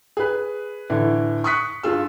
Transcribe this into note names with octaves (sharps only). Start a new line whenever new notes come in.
G#4 B4
A2 D3 E3
C#6 D#6 F#6 B6 C#7
G2 F4 G#4 E6